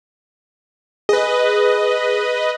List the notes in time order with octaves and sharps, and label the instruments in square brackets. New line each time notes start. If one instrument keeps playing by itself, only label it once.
[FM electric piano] G#4 [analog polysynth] B4 D#5